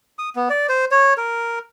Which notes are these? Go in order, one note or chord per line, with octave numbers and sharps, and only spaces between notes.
D#6
B3
D5
C5
C#5
A#4